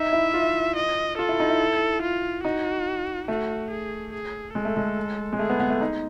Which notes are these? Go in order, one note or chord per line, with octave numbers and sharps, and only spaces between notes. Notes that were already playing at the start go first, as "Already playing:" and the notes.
Already playing: D#4 E5
E4
F4
D#5
F4 A4
E4
D#4
E4
F4
D#4 F#4
A3 F#4
G#4
G#4
G#3 A4
A3
G#3
G#3
A3 G#4
B3
B3
A3
D#4